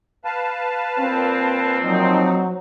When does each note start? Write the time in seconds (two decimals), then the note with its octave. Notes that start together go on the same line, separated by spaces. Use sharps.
0.25 B4 F5 A5
0.99 A#2 C4
1.83 F3 F#3 D#4